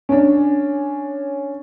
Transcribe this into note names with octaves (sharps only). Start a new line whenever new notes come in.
C#4 D4